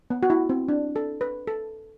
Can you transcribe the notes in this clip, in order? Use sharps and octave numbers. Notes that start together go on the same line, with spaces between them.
B3
F#4
E4
C4
D4
A4
B4
A4